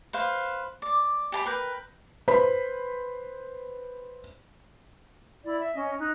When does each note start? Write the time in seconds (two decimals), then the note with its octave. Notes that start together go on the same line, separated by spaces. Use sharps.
0.13 B4 C5 F5
0.82 D5
1.32 G4 A5 B5
1.45 A#4 B4 G5
2.28 B4 C5 B5
5.44 E4 D5
5.59 E5
5.74 C#4 D#5
5.98 D#4 F#6